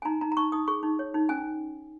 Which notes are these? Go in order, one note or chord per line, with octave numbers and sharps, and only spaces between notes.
G#5
D#4 A#5
D#4 A#5
A#5
D#4 C#6
D#4 D#6
G#4 C#6
D#4
C#5
D#4
C#4 G#5